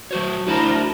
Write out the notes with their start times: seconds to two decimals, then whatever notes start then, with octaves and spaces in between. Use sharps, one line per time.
0.11 F#3 A3 F#4 C5 C#5
0.47 D2 A3 E4 F#4 A#4 C5 A5